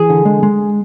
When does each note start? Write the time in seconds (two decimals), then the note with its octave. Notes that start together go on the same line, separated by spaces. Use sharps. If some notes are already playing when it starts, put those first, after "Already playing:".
Already playing: E3 G#4
0.10 D3
0.25 G#3
0.43 G#3